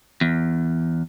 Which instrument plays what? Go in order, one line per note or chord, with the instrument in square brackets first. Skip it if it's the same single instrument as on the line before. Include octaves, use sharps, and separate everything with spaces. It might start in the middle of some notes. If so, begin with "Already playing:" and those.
[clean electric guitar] E2